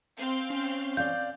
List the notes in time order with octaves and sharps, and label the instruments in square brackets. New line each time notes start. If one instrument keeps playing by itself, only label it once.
[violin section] C4 F5 G6
[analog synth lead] C#4
[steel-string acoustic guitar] D5 F5 [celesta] G6